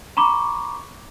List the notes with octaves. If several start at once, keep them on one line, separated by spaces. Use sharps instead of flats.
A#5 B5 C#6 D6